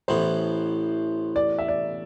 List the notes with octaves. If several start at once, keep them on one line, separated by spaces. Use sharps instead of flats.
A1 A2 E3 B3 C5
D5
E5
D5